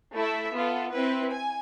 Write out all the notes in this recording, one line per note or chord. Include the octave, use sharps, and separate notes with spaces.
A3 E4 A4 E5
B3 F4 A4
C4 E4 B4
G#5